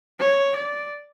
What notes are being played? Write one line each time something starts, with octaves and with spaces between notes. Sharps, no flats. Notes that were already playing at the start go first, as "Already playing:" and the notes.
C#5
D5